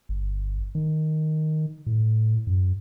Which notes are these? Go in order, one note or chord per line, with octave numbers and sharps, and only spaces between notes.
G1
D#3
A2
F#2